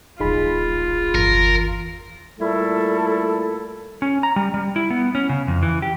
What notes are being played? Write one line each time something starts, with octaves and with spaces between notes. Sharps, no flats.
D1 A#1 D#4 F4 G#4 B5
G1 E2 E3 A#4
A#2 G3 A3 E4 A4
C#4
A#5
G3
G3
E4
B3
C#4
C#3
F2
E3
G4